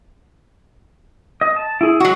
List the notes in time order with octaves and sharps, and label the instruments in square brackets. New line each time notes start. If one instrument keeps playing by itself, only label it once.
[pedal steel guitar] D#5
A5
E4 G#4
[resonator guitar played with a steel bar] F#3 F#4 [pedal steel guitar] G#3 C#5